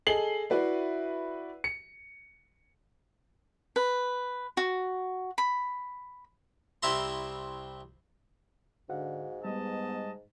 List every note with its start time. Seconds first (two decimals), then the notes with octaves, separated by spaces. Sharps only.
0.07 G#4 A4 D#5 C7 F#7 G7
0.50 E4 F#4 B4 D5 E5
1.64 C#7
3.76 B4
4.57 F#4
5.38 B5
6.83 C2 C4 E4 E5 A#5 C6
8.89 G#2 D3 F#4 F5 F#5
9.45 G3 G#3 B3 D#5 A5